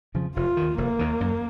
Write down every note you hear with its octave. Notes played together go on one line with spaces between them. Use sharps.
F2 C#3 F3
F1 F4
D#3
D#2
F1 A#3
D#2 D#3
F#2